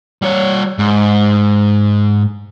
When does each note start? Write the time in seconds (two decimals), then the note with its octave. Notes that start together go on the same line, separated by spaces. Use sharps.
0.22 G3 C#5
0.79 G#2